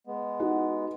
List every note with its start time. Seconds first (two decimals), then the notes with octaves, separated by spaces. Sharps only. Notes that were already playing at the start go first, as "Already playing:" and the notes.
0.07 G#3 B3
0.39 D#4 F#4 F#5